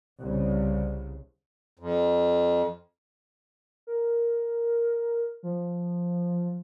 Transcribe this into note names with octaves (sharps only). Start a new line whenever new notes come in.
C2 C#3
F2
A#4
F3